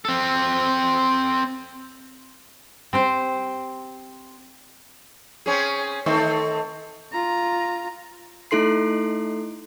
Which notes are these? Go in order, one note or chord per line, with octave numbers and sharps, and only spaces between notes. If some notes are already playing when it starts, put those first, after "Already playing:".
C4 A4
C4 G4 C5
C4 C#4 G#4
D#3 A3 C4
F4 A#5
A3 D#4 E4 A4 C6 C7